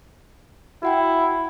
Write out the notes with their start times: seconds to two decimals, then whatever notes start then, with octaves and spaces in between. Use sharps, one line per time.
0.83 E4 F#4 F#5 G5